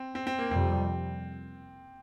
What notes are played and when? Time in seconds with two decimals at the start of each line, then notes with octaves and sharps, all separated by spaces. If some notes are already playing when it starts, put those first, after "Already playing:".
Already playing: C4
0.15 C4
0.27 C4
0.39 A#3
0.50 F2 C3 G3 C4